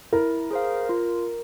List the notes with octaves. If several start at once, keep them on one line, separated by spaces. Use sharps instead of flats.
E4 A#4
G#4 C5 F5
F4